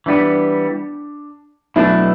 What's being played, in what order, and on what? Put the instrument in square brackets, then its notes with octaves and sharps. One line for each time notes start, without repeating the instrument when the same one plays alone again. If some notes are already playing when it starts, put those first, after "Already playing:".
[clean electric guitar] E3 G3 B3 [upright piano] D4
[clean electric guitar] B1 B2 A3 D4 [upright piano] E4